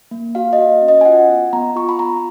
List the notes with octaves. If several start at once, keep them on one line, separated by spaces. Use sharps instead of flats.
A#3
F#4 F5
D#5
F#4
C#4
D#5
G#5
F4 F#5
B3
B3 A#5
F4 C#6
B5
B3 A#5